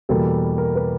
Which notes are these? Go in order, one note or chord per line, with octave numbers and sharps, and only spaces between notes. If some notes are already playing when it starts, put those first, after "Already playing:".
E2 B2 G3 A#3 A4
A#4
B4